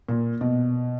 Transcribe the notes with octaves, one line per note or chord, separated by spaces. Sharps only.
A#2
B2